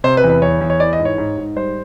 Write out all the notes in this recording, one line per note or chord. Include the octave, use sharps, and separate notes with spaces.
C3 C5
B4
E2
B4
E2 C#5
E2
C#5
E3 D5
D#5
G#2
C#5
G#2
G#2
G3 C5